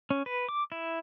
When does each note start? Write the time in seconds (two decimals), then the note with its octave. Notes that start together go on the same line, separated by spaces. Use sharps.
0.10 C#4
0.26 B4
0.49 D6
0.72 E4